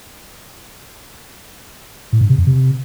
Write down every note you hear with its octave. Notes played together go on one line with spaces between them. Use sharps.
A2
G#2
C3
F2
C3